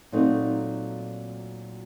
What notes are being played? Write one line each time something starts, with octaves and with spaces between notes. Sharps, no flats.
A#2 F#3 A3 C4 D#4